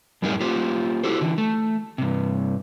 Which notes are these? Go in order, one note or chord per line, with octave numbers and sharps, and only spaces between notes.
F#2 A2 G3 D#4 G#4 A#4
A#3 F4 G4 C5
E4 F#4 G4 A4 C5
D3 E3
A3
G2 C3